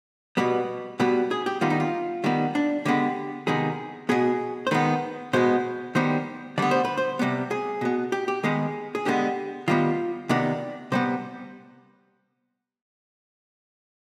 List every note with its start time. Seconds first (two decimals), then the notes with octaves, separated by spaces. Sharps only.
0.37 B2 G3 B3 B4
1.00 B2 G3 B3 B4
1.31 G#4
1.46 G4
1.61 D#3 G3 B3 F4
1.70 D#4
1.80 F4
2.24 D#3 G3 B3
2.55 D4
2.85 D3 G#3 B3 G4
3.47 C3 D#3 G#3 B3 G#4
4.09 B2 B3 G#4
4.67 C5
4.71 D#3 G#3 B3 B4
5.33 B2 G#3 B3 C5
5.95 D#3 G3 B3 C5
6.58 D3 G3 B3 D5
6.71 C5
6.85 B4
6.97 C5
7.19 C3 G3 B3
7.51 G#4
7.81 B2 B3
8.12 G4
8.28 G4
8.43 D#3 G#3 B3 G#4
8.95 G#4
9.05 D3 G#3 B3 G4
9.68 D#3 G3 B3 F4
10.29 C3 D#3 B3 D5
10.92 C3 G3 B3 C5